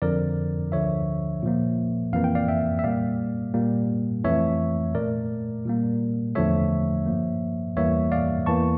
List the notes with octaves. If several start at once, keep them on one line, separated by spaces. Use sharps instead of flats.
F2 D3 F3 A#4 D5
D2 D3 F3 C#5 E5
A#2 F3 A#3
F2 E3 A#3 F5
G5
D5 F5
E5 G5
E5
A#2 G3 A#3 D5 F5
A#2 G3 A#3
F2 E3 A3 C#5 E5
A#2 A3 A#4 D5
A#2 G3 A#3
E2 D3 F3 A3 C#5 E5
G2 F3 A#3
E2 E3 G3 A#3 C#5 E5
D5 F5
E2 E3 A#3 A5 C#6